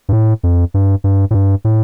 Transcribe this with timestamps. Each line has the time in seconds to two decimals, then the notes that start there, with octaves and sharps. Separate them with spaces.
0.09 G2
0.13 A2
0.43 F2
0.74 G2
1.04 G2
1.31 A2
1.34 G2
1.65 A2